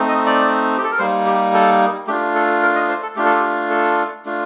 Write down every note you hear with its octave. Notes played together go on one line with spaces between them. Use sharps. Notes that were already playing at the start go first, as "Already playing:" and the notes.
Already playing: A3 C4 D#4
D#5
D5
G4
A4
A#4
G3 A#3 D#4 C5
G4
A4
A3 D4 F4 G4
A4
A#4
D#5
C5
A4
A3 D4 F4 G4
A4
G4
A4
A3 D4 F4